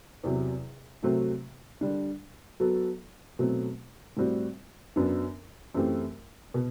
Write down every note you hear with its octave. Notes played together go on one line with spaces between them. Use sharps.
E2 C3 F#3
C3 F#3 A3 C4 F#4
D3 G3 D4
F#3 B3 F#4 A4
B2 F#3 A3 C4
A2 G3 C4 F#4
F#2 F#3 B3 D4
F#2 E3 A3 C4 G4
B2